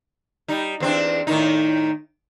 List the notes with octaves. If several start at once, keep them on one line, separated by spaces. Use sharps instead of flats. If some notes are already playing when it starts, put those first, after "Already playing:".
G3 D#4
E2 C4 D4
A2 D#3 D#4